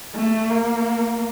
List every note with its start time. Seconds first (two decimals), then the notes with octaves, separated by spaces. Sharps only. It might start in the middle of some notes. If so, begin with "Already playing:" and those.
0.15 A3
0.50 A#3